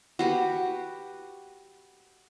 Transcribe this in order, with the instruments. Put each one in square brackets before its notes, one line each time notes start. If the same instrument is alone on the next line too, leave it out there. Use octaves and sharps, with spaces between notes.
[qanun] F#4 G4 B4